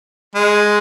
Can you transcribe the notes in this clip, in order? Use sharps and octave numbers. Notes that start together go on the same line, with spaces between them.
G#3